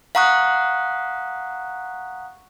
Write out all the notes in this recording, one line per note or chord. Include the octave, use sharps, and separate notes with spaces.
F5 F#5 A#5 C#6 D#6 F#6